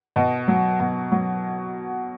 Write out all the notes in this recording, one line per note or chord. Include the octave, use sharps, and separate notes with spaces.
B2 D#5
F#3
B2
F#3